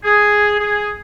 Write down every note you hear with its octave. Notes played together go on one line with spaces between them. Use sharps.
G#4
G#4